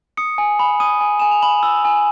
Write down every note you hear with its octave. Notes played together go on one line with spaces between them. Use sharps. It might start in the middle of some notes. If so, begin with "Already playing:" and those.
D#6 C#7
G#5
B5
D#6 D#7
G#5
G#5 E7
F7
B5 F#7
E6
G#5